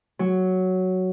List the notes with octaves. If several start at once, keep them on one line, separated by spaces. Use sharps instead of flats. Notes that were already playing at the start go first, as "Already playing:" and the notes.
F#3